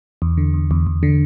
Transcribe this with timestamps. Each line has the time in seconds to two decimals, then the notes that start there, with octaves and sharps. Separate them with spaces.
0.22 E2
0.37 D3
0.54 E2
0.71 E2
0.87 E2
1.03 D3